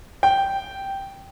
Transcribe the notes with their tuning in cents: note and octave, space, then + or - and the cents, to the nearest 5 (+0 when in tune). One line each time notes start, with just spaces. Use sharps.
G5 -5